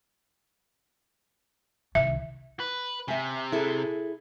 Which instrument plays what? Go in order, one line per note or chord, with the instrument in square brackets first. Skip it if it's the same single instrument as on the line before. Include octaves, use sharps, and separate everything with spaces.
[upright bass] C2 D#3 [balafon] E5
[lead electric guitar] B4
[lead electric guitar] C3 [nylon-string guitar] E5 G#5
[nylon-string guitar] E4 G#4 A4